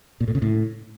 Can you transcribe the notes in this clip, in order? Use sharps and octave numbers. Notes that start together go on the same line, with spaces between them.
A#2
A2
C#3
A2